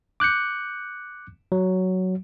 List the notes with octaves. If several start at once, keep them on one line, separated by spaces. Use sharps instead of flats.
D6 F#6 G6 C#7
F#3